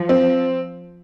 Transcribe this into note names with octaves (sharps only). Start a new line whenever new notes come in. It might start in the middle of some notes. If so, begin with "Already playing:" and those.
Already playing: F3
C4